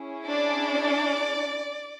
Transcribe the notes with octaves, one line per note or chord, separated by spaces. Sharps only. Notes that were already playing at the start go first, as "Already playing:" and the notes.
Already playing: C#4 E4 G#4
D4 D5